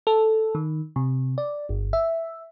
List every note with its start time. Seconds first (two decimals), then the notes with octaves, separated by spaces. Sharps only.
0.07 A4
0.55 D#3
0.96 C3
1.38 D5
1.69 G1
1.93 E5